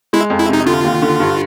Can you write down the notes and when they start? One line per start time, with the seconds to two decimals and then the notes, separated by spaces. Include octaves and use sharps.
0.13 G#3 E4
0.30 F2
0.39 E4
0.49 C3 D#4
0.66 D3 F4
0.84 D#2
1.02 D3
1.20 G2